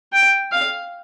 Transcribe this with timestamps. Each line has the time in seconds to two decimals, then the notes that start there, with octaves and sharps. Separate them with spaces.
0.12 G5
0.52 F5